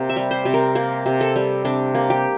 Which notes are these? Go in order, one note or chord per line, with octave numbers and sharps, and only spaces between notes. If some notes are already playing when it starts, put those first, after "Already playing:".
Already playing: C3 A#3
E5
G3
C5
C3
A#4
A#3 A#4
C3
A4
G3
C3 D4
A#3
G4